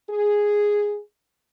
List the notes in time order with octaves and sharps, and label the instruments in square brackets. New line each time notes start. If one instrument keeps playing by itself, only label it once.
[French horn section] G#4